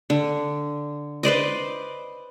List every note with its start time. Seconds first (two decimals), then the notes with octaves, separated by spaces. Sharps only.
0.10 D3
1.23 B4 C5 D5 D#5